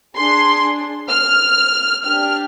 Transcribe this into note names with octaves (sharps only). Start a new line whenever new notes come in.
D4 G#4 C6
F6
D4 G4 F6